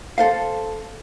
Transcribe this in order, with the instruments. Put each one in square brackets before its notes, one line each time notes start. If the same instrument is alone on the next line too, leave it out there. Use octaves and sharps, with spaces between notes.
[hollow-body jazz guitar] A4 C5 F5